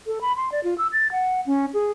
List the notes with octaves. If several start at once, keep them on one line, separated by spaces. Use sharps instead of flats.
A4
B5
C6
D5
F4
E6
A6
F#5
C#4
G#4